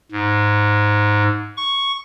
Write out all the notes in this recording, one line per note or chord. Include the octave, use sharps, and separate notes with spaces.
G#2
C#6